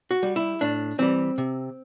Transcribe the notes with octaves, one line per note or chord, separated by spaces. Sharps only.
F#4
G3
E4
A2 D4
E3 G3 C4
C3